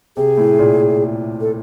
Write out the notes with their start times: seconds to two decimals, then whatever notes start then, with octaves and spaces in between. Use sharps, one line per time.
0.17 C3 G#4
0.37 A2
0.59 A#2
1.41 A4